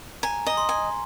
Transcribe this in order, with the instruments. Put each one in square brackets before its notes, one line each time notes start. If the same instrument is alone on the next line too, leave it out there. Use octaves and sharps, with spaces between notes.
[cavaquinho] G#5 [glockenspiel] A#5
[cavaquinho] D#5 [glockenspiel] A#5
[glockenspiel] C6
[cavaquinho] G#5